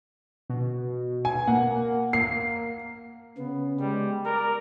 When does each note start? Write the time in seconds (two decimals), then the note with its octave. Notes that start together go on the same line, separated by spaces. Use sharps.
0.50 B2
1.25 G#5
1.47 A#3 F#5
2.13 A#3 C7
3.38 C#3 B3
3.80 G3 G#3
4.26 A#4 D5